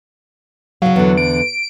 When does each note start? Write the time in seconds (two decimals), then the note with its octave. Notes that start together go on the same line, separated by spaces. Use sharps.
0.82 C#3 F#3 F5
0.96 E2 D3
1.17 D7